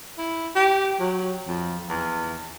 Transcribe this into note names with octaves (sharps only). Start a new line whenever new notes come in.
E4
G4
F#3
F2
E2